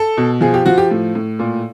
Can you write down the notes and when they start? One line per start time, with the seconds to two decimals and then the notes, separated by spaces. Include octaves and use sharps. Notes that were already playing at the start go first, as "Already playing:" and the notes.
Already playing: A4
0.17 B2
0.41 F3 G#4
0.54 G4
0.66 F3 F#4
0.78 G4
0.91 A2
1.15 A2
1.39 A#2